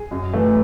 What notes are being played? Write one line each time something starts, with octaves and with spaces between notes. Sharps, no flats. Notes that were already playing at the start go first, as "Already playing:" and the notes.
Already playing: G#4
F#2
E3 A3